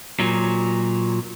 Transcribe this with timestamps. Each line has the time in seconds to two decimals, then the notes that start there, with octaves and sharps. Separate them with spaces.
0.20 A#2 F#3